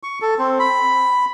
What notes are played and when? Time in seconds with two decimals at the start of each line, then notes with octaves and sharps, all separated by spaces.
0.03 C#6
0.22 A4
0.39 C4
0.60 B5